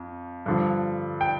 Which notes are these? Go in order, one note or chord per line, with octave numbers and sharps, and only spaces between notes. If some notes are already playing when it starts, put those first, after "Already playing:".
Already playing: F2
G2 D3 F3
G5